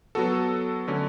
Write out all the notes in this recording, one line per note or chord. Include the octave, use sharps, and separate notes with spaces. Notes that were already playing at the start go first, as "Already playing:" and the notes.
F#3 B3 F#4 A4
D3 F#3 A3 C#4